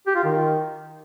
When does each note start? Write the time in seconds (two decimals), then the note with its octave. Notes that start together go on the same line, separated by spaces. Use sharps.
0.07 G4
0.16 F4
0.24 D#3